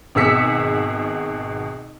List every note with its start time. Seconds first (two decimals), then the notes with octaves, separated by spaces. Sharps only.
0.15 G#1 B2 G#4 E6 B6 C#7